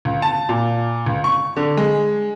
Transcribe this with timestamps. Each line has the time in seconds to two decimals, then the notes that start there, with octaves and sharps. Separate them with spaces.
0.05 C#2
0.22 A5
0.49 A#2
1.06 C#2
1.24 C#6
1.57 D3
1.77 G#3